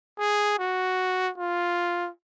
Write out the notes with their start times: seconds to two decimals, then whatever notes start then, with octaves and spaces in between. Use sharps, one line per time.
0.19 G#4
0.59 F#4
1.38 F4